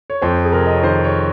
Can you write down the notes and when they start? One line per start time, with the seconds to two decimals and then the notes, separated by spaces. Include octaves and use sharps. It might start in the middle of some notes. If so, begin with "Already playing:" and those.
0.10 C#5
0.22 F2 C5
0.45 G#4
0.52 C3 A#4
0.67 D#5
0.75 C#5
0.83 D#3 C5
1.04 C#5